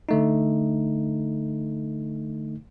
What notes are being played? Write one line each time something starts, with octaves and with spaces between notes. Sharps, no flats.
D3 A3 D#4